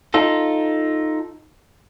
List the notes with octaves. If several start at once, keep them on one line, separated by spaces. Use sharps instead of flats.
D#4 F4 A4